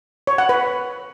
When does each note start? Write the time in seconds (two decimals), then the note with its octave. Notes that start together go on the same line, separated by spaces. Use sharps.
0.27 C#5
0.38 F#5
0.49 B4